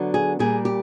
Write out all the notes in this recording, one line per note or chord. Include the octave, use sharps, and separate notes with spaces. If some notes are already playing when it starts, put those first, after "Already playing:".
Already playing: D3 F#3 B3 D4
G#4
A#2 G3 A#3 G#4
G4